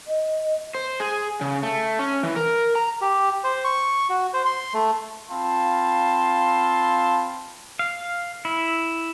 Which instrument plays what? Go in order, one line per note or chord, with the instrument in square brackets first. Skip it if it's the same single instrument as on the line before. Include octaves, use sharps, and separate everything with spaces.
[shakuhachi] D#5
[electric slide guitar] C5
G#4
C#3
A3
C#4
E3
A#4
A#5
[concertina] G4
C5
C#6
F#4
C5
C6
A3
[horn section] C4 F4 F5 A5 B5 C6
[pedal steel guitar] F5
E4